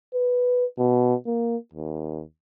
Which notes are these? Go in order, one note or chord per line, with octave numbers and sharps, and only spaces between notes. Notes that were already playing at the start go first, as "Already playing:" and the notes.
B4
B2
A#3
D#2